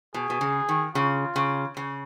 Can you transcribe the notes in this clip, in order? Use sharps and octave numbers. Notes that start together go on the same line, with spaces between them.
B2 G#4
B2
C#3
D#3
C#3 F4
C#3
C#3